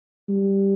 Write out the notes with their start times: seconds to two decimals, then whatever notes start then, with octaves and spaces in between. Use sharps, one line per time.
0.29 G3